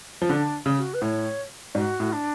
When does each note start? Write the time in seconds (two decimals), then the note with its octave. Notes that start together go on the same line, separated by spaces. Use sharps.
0.22 F3
0.29 D3 D4
0.66 C#3
0.77 F#4
0.93 B4
1.02 A2 C#5
1.75 G#2 F#4
2.00 A2
2.12 D4